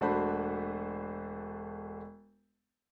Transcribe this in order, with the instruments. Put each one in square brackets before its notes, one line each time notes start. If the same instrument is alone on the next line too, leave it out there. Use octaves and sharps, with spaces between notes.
[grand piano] E1 A3 D4 F#4 C5 B5